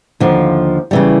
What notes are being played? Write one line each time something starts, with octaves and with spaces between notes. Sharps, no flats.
D#2 D3 F3
C#3 E3 G3